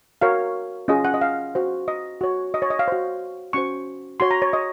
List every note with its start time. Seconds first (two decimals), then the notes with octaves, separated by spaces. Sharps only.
0.21 F#4 A#4 C#5 F5
0.88 C#4 F4 G#4 D#5
1.05 F#5
1.14 D#5
1.21 F5
1.55 F#4 C5
1.88 D#5
2.21 F#4 C#5
2.54 D#5
2.62 C#5
2.70 D#5
2.79 F5
2.88 F#4 C5
3.53 C#4 F#4 C5 C#6
4.20 F#4 C#5 C6
4.31 A#5
4.42 C#5
4.53 D#5